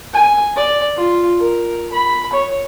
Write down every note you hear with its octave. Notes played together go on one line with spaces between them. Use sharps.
G#5
D5
F4
A#4
B5
C#5